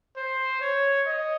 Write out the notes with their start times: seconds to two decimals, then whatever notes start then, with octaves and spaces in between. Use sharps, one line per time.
0.16 C5
0.61 C#5
1.06 D#5